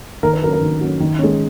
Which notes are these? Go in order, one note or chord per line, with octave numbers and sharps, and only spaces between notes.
D#3 A#4
B4
F#3 C#4 A#4
A#4
D#3
F#3 C#4
D#3
G#3 C#4